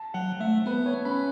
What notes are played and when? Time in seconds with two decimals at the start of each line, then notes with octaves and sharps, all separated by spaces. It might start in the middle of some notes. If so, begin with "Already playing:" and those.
Already playing: A5
0.14 F#3 F#5
0.40 A3 E5
0.66 B3 B4
0.86 C#5
1.05 C#4 B5